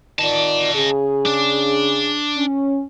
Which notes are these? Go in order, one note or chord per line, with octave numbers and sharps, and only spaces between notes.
D#3 F4 D5 D#5 A5
C#3 G#4
D4
C#4